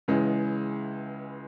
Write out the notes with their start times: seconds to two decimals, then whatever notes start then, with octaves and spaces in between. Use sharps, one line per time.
0.08 C#2 C#3 E3 G#3